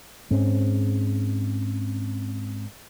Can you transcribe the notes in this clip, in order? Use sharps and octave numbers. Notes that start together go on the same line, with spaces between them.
G#2 C4 C#4